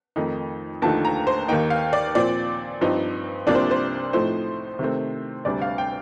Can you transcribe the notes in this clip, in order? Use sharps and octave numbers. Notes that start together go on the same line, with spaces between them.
F2 D#3 A3 D#4
D#2 D3 F3 A3 D#4 A5
A#5
C5
D#2 D#3 A#3 D#4 G5
F5
D5
A#2 F3 C4 D5
G2 F3 C4 D#4
C2 C3 F3 A#3 D4 D5
C5
C5
A2 F3 A3 C4 D#4 C5
C3 D#3 A3 C4
D2 C3 G3 D4 D5
F5
G5